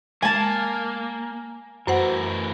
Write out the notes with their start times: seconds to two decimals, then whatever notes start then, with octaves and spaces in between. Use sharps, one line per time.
0.22 G#3 A#3 G#5 A5
1.87 F#2 E3 A3 A#4 C5 F#5